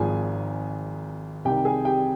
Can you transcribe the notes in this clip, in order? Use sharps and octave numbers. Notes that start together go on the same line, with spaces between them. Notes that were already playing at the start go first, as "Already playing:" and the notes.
Already playing: G#1 G#2 F3 G#4 G#5
C2 C3 D#3 G4 G5
G#4 G#5
G4 G5